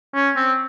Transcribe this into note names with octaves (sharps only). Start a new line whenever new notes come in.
C#4
C4